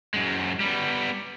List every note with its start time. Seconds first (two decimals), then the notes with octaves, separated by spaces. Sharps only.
0.14 F#2 G#3
0.60 G3 B3